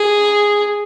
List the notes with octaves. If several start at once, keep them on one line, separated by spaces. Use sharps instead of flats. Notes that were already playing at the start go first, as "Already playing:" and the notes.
Already playing: G#4